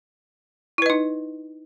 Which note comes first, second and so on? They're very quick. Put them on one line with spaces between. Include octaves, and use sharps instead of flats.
E4 B4 D#5 D#4